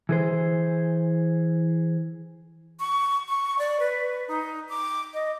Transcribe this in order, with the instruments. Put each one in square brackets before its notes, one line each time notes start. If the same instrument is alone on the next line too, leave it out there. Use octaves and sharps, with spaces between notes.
[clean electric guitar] E3 G#4 C5
[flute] C#6
C#6
D5
B4
D#4
D6
D#5